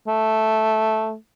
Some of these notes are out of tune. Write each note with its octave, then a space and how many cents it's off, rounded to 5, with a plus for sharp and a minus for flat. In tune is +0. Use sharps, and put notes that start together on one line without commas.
A3 -5